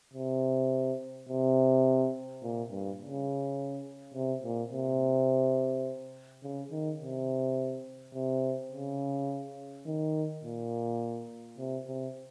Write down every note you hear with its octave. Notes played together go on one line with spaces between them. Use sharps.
C3
C3
A#2
G2
C#3
C3
A#2
C3
C#3
D#3
C3
C3
C#3
D#3
A#2
C3
C3